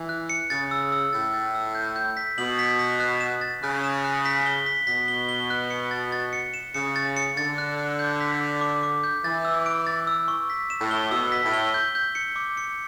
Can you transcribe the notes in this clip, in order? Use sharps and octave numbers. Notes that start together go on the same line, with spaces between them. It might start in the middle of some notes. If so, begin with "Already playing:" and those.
Already playing: E3
F#6
C#7
C#3 A6
E6
E6
A2 A6
A6
E6
G6
G6
B6
B2 F#7
B6
B6
F#6
E7
A6
C#3 F#6
E7
F#6
B6
G7
B6
B2 B6
G7
G7
F#6
C#7
A6
A6
C#7
E7
C#3 C#7
A6
C#7
D3 A6
F#6
F#6
G6
B6
D6
D6
D6
G6
E3 A6
E6
D7
A6
E6
C#6
B6
E7
A2
G7
B2 E6
B6
A2
G7
G6
G6
C#7
D6
C#7